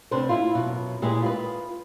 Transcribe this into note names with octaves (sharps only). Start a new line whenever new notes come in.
D2 C3 D4 B4 C5
E4 F4
F#2 B2
A#2 G#3 B3 E4 G4 G#4
F4 B4